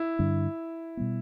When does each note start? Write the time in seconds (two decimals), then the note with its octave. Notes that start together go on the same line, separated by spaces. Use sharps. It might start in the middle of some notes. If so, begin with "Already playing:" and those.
Already playing: E4
0.19 G2 D3 G3 D4
0.97 B2 G3 B3